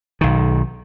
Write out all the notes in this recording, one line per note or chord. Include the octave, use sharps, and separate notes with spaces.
B1 D#3